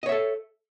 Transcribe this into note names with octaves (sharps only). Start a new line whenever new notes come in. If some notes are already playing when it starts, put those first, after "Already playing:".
A4 C#5 D#5 E5